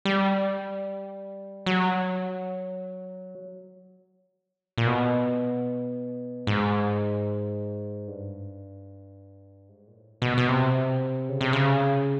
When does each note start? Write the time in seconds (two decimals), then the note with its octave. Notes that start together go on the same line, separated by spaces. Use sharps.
0.05 G3
1.66 F#3
4.78 A#2
4.87 B2
6.47 G#2
8.08 G2
9.69 G#2
9.87 A#2
9.95 A2
10.22 B2
10.38 B2
10.49 C3
11.29 C#3
11.41 C3
11.53 C#3